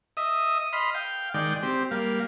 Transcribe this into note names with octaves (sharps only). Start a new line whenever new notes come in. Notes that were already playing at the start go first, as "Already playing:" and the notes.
D#5 E5 D#6
D#5 B5 C6 F6
F5 G5
D#3 G#3 D5 G5
C4 G4
G3 A#3 F5